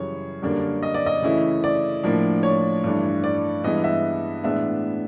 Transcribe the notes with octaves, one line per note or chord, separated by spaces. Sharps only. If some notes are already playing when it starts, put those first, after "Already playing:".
Already playing: F#2 C#3 E3 G3 C#5
F#2 D3 G3 A#3 D4
D#5
D5
D#5
C#3 E3 A3 C#4 E4
D5
A2 F3 A#3 D4
C#5
G2 E3 A3 D4
D5
G2 E3 G#3 B3 E4 D#5
E5
A2 E3 G#3 B3 D4 E5